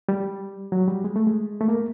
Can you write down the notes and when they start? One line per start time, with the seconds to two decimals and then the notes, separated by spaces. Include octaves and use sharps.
0.09 G3
0.72 F#3
0.88 G3
1.04 G#3
1.16 A3
1.27 G#3
1.61 A3
1.68 A#3